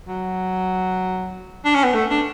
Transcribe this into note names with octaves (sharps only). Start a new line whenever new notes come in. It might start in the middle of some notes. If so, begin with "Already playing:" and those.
F#3
D4
C#4
B3
A3
D4